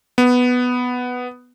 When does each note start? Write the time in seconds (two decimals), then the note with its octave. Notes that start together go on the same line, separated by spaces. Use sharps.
0.18 B3